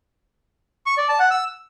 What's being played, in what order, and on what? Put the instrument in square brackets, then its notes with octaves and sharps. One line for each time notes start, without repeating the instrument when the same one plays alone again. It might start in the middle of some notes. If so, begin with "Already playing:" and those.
[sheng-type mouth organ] C#6
D5
A5
F#5
E6